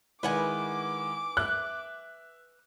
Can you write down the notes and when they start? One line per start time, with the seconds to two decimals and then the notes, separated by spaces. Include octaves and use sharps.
0.23 D#3 G#3 E4 B4 F#5 G#5 D6
1.37 E5 F#6